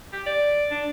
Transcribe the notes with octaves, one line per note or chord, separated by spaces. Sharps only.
G4
D5
D4